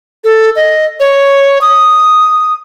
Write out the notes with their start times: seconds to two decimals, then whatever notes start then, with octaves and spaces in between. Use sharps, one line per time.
0.24 A4
0.56 D#5
1.00 C#5
1.61 D#6